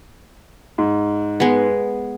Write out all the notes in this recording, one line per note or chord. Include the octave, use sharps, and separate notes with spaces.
G#2
G#3 B3